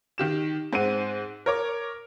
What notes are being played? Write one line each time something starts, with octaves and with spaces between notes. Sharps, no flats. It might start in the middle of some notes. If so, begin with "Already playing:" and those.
D#3 G4 E7
G#2 C4 F#5 D#7
A#4 C#5 D6